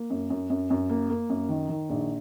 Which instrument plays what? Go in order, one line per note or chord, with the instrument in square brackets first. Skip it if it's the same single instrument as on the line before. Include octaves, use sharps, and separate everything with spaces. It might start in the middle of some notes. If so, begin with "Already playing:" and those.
Already playing: [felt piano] A#3
F#2
F#2
F#2
F#2
A#3
A#3
F#2
D#3
D#3
A#1